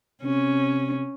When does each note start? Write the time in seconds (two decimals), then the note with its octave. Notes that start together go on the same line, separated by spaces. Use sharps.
0.23 C3 C#4